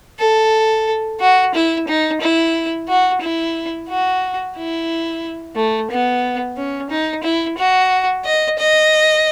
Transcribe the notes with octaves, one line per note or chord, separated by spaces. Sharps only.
A4
F#4
E4
D#4
E4
F#4
E4
F#4
E4
A3
B3
C#4
D#4
E4
F#4
D#5
D#5